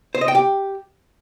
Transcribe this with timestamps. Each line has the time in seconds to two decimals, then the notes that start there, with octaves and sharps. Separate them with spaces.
0.15 C5
0.21 D#5
0.28 G5
0.35 G4